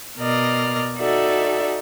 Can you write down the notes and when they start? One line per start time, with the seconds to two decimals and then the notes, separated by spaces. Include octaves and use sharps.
0.17 B2 A#4 D5 D#5 F6
0.97 D#4 F#4 A4 D5 E5